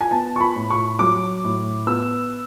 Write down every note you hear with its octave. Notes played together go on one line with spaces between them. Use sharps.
G#5
B3 A5
C#6
B5
A2
C#6
F#3 D6
A2
B3 E6